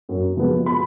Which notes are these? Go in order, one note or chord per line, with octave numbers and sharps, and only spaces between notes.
F#2
F3 G#3 B3
B5